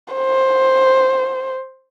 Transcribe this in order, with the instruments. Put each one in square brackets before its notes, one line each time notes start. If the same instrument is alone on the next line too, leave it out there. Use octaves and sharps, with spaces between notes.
[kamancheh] C5